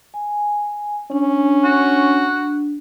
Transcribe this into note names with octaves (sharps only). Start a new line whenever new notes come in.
G#5
C#4 D4
F#4